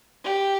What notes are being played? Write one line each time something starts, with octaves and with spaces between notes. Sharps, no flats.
G4